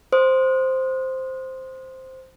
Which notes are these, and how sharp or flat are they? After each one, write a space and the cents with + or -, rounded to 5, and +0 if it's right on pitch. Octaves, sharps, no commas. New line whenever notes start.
C5 +0 D#6 -10